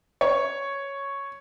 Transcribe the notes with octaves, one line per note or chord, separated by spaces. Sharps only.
C#5